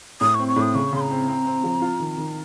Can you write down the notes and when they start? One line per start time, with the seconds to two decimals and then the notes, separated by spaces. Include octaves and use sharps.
0.21 A2 D#6
0.35 C4 C#6
0.48 C#6
0.56 A2
0.61 D#6
0.75 C#3 C#6
0.93 C#3 C6
1.01 A#5
1.11 C4
1.28 C4
1.46 C4
1.64 F3
1.82 F4
2.00 D#3
2.18 D#3